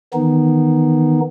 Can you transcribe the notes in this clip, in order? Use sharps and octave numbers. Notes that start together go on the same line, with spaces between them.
D#3 E3 B3 D#4